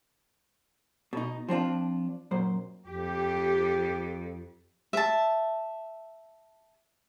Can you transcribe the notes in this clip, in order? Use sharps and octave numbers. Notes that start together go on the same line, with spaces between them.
B2 D#4
F3 C4 D4 F4
F#2 A#2 C5
F2 G4
E5 A5